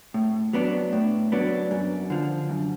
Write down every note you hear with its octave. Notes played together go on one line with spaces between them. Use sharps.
A2
F#3 B3 D4
A2
F#3 B3 D4
F#2
D3 F3
F#2